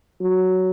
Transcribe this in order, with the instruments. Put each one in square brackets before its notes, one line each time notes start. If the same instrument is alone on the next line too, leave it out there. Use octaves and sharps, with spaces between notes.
[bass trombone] F#3